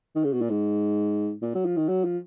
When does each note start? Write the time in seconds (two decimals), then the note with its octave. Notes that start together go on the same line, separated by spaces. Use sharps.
0.16 D#3
0.24 C#3
0.33 B2
0.41 A#2
0.50 G#2
1.42 A#2
1.55 F#3
1.65 F3
1.77 D#3
1.89 F#3
2.05 F3